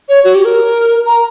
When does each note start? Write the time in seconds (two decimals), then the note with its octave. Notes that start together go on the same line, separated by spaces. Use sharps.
0.09 C#5
0.25 F#4
0.35 G4
0.45 A#4
1.07 A#5